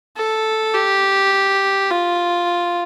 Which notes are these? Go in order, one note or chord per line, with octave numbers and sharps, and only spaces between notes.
A4
G4
F4